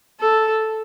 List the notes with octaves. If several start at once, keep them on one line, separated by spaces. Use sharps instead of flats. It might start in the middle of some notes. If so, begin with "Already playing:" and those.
A4